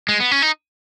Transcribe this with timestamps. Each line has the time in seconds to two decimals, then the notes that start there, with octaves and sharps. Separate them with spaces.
0.09 G#3
0.20 B3
0.31 C#4
0.42 D#4